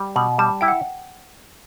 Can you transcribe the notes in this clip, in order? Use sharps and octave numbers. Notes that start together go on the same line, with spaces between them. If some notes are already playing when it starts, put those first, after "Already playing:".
Already playing: G3
B2 B5
G3 A5
E4 G5
F#5